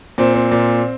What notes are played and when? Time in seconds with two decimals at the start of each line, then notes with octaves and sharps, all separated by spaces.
0.18 A#2 C4
0.35 C4
0.51 A#2